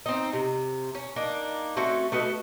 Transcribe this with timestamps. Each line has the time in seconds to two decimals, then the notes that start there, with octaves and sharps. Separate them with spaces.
0.06 C4 D#4
0.33 C3
0.95 C#4
1.16 A#3 D4 D#4
1.76 A3 C4 C#4 F#4
2.12 A3 F#4 B4 D#5